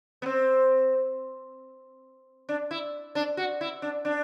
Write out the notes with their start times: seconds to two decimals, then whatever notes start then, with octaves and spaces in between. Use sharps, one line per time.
0.22 B3
0.26 C4
2.49 D4
2.71 E4
3.15 D4
3.37 F#4
3.61 E4
3.82 D4
4.05 D4